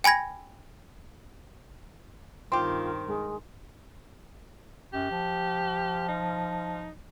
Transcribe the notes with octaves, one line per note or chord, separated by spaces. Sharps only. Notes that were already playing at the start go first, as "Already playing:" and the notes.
G5 G#5 B5 G#6 A#6
G2 D#3 C4 F4 G4 C6
G#3
F#2 G4
F3
D#4